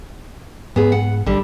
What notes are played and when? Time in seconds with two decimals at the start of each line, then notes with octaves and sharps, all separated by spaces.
0.76 G#2 B3 G#4
0.92 F#5
1.26 A1 D3 G3